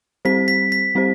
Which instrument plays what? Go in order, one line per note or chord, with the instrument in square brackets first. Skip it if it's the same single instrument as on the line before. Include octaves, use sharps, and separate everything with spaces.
[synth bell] G3 C4 G4 C5 [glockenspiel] B6
[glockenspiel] B6
B6
[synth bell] G3 C4 G4 C5